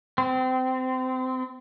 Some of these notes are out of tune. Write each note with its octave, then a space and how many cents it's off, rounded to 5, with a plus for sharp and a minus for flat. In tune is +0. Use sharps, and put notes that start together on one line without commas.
C4 -25